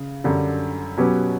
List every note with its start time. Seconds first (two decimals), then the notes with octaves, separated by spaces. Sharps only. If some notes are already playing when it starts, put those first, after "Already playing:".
Already playing: C#3
0.24 F#2 D3 G3
0.97 B2 F#3 C#4 G4 B4